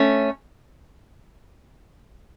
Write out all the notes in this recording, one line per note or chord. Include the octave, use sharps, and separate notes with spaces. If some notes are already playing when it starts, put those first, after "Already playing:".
Already playing: A3 C#4